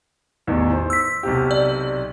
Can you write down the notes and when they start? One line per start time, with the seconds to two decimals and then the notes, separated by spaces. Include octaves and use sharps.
0.47 A1 E2 D#3
0.71 C5
0.90 E6 B6
1.23 B1 C3 G4
1.51 D5